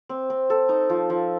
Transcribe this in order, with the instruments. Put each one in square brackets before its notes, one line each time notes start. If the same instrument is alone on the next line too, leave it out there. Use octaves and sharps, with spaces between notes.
[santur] C4
C4
A4
D#4
F3
F3